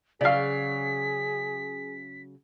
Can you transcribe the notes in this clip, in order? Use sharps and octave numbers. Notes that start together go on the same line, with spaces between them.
C#3 F#3 G#4 D5 F5 B6